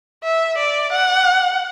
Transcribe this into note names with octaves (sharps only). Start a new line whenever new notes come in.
E5
D5
F#5